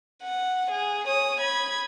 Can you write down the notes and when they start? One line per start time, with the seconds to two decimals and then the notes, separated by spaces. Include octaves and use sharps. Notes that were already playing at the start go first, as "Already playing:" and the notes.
0.22 F#5
0.70 G#4
1.07 C#5 D#6
1.41 B5 G#6